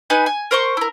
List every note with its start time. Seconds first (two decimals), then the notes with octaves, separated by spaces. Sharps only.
0.10 D#4 B4 G#5 F#6
0.26 G#5
0.51 A#4 C5 C6 C#6
0.77 E4 A#4